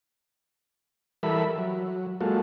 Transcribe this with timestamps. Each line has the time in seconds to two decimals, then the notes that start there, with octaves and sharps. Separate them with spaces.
1.23 E3 G3 A4 A#4 E5 B5
1.58 F#3
2.21 G#3 A#3 F4 F#4 A4